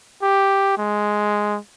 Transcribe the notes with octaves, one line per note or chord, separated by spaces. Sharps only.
G4
G#3